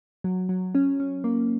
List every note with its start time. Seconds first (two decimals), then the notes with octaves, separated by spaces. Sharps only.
0.24 F#3
0.49 F#3
0.75 C#4
1.00 C#4
1.24 A#3